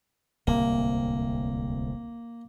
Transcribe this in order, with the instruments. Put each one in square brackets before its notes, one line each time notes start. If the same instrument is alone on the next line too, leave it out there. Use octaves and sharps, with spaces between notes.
[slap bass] D1 C2 C3 [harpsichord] A#3